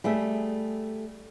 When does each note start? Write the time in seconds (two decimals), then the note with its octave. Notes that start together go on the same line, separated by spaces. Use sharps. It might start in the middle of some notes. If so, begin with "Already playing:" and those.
0.04 G3 A3 G#4 E5